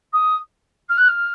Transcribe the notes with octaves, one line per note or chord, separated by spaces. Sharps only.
D#6
F6
F#6
F6